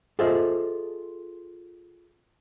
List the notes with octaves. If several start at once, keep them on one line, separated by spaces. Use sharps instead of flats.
F4 G#4 A4 C5 D#5 E5